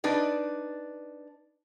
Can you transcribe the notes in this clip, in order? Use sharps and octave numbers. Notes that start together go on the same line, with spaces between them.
D4 D#4 B4 D5